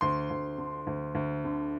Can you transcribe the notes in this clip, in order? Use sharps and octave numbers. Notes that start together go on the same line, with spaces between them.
D2 C6
D2
D3
D2
D2
D3